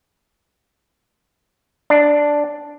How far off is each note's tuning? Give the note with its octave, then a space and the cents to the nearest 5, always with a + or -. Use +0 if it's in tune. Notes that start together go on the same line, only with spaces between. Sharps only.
D4 +0